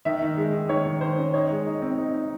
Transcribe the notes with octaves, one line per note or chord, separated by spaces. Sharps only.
D#3 E5
D#3
G#3
D#3
D#3 C#5
D#3
D#3 C5
C#4
D#4 C#5
G#3
D#4
C4
D#4
D#4